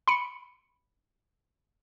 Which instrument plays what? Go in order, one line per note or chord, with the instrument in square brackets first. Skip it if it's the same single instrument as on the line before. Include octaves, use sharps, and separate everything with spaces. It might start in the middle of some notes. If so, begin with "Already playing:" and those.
[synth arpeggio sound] B5 C#7